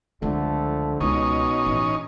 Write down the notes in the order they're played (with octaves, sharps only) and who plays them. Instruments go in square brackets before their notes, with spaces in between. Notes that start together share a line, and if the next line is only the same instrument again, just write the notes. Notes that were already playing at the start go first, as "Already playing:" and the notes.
[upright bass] C#2 C4 [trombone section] D3 F3 A3
[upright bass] C#2 [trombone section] B2 [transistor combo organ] C#4 D#4
[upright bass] A1